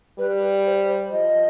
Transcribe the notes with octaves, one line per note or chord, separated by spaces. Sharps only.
G3 B4
B4
C5
C5
F3 D#5